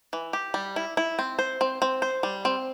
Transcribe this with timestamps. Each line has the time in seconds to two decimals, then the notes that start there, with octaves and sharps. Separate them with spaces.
0.13 E3
0.33 G4
0.54 G3
0.76 E4
0.97 E4
1.19 C4
1.39 C5
1.61 C4
1.82 C4
2.02 C5
2.23 G3
2.45 C4